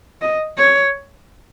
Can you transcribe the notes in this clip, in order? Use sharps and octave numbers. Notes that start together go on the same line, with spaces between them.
D#5
C#5